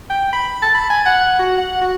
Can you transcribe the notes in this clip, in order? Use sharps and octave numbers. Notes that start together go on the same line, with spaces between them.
G5
B5
A5
B5
G#5
F#5
F#4
F#5
F#4